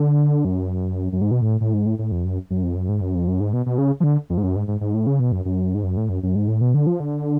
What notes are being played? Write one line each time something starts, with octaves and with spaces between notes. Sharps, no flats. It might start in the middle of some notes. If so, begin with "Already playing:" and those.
Already playing: D3
F#2
F#2
G#2
B2
A2
A2
G#2
A2
A2
F2
F#2
F#2
F2
F#2
G#2
F#2
F2
F#2
G#2
B2
B2
C#3
F3
D3
F2
G#2
F#2
G#2
G#2
G#2
A2
C#3
B2
F#2
F#2
G#2
F#2
A2
F#2
F#2
G#2
A2
B2
D3
F3
D3